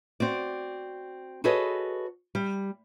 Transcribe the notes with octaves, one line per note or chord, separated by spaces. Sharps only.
C4 F#4 D5
F#4 G#4 A4 B4 C#5 D#5
G3